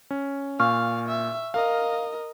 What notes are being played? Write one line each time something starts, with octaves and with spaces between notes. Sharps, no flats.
C#4
A#2 F5 G#5 C#6 F6
E5
A#4 D#5 F5